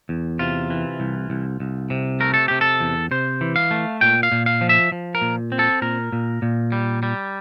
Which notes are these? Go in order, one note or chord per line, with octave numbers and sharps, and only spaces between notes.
E2
C3 F4
E3
C2
C2
C2
C3
A3 A#4
A4
C3 G4
A4
E2
C3 C5
E3
F5
A3
A#2 G5
F5
A#2
F5
F3
E5
F3
A#4
A#2
C4
A4
A#2 A#4
A#2
A#2
G3
G3